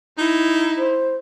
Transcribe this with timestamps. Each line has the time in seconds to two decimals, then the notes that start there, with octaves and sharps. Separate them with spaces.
0.18 D#4 E4
0.78 C5